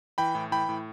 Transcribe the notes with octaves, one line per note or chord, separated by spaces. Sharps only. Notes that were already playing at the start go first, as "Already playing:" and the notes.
E3 G5 B5
A2
E3 G5 B5
A2